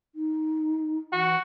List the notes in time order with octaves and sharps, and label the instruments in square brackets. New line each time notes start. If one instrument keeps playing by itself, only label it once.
[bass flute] D#4
[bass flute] E3 [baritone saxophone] F#4